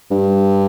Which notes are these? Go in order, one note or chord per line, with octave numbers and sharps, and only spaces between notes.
G2